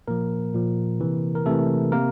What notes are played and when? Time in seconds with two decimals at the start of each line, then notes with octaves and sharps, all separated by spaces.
0.08 A#2 F3 A#3 A#4
0.54 A#2 F3
1.00 C3 E3
1.35 A#4
1.46 C3 E3 A3 A4
1.92 C3 A#3 A#4